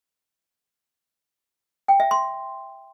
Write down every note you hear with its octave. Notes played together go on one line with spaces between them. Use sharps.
G5
E5
C6